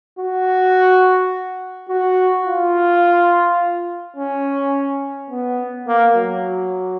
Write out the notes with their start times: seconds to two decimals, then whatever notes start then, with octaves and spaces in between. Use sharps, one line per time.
0.19 F#4
1.89 F#4
2.46 F4
4.16 C#4
5.30 B3
5.87 A#3
6.16 F#3